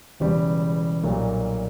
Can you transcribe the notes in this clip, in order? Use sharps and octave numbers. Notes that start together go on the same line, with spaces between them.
E1 E2 C#3 G3
B1 A#2 G3 A#3